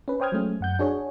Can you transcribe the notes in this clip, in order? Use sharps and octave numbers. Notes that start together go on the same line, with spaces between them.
C#4 B4
C5 C#5 G5 D#6 F6 G#6
F#3 G#3 A3 C#4
F#2 F#5 G6
D4 F#4 G#4 C#5